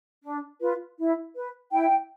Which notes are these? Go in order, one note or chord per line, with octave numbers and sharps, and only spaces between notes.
D4
F4 B4
E4
B4
E4 G5